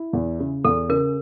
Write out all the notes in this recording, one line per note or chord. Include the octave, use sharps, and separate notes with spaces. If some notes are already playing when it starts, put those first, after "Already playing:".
Already playing: E4
E2
C#3
E2 A4
C#3 A#4